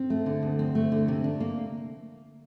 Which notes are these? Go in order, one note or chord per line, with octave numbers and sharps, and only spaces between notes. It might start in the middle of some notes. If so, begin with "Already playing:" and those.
Already playing: C4
A3
D3
D2
C4
A3
D3
C3
D4
A#3